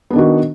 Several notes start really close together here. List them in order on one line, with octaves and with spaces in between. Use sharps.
B3 D4 D#3 F#4